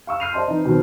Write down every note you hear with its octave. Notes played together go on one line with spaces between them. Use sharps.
F5 C#6 E6
F6 G6 C7 D#7 F7
C5 D5 D#5 A5 C6
E3 C4 D#4
B2 D#3 F#3 C4